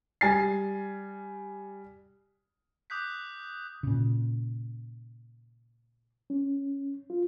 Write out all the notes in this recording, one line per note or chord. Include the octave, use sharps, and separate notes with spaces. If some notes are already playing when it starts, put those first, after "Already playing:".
G3 G#5 A6 C7
D6 D#6 F#6 G6 B6
A#2 C#3
C#4
F4